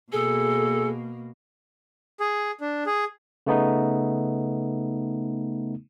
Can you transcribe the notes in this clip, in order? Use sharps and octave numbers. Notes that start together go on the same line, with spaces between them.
B2 A#3 G#4 A4
G#4
D4
G#4
C#3 A3 B3 D#4